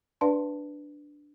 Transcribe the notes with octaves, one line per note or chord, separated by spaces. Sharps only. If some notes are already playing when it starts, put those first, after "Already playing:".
D4 B4 D5 F5 A5 C6